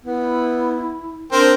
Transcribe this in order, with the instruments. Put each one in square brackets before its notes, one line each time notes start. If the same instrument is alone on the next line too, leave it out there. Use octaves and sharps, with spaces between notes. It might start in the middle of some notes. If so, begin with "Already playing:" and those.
[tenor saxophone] B3 [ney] E4
[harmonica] C4 [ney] D4 [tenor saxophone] A#4